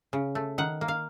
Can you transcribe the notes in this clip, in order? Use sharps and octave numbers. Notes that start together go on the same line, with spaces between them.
C#3
A3
D#3 F#5
A#3
F5